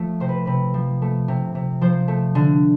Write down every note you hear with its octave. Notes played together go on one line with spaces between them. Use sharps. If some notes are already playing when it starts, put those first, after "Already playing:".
Already playing: F3 A3
C3 C5
B4
C3 B4
F3
A3
C3
C3
F3 C5
A3
D3